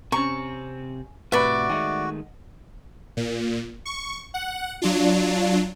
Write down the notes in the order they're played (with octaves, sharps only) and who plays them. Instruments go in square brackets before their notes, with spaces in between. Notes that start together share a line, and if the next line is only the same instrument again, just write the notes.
[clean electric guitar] C3 C4 [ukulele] C#4 A#5 [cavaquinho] C#6
[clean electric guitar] A2 C3 [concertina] F#4 [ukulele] B4 F#5 B5 [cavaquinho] D5 E5
[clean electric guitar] D#3 G#3 A3 [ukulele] D#5 F#5
[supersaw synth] A#2
C#6
F#5
F#3 D4 F4